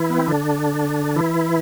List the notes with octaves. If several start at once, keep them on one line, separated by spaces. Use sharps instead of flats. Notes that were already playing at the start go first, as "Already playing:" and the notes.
Already playing: E3 E4
B3
C4
D3 D4
E3 E4